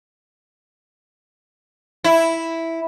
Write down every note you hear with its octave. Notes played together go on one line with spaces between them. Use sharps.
E4